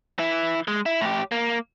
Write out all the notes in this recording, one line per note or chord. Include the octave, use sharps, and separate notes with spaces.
E3 E4
G#3
E4
A2 G4
A#3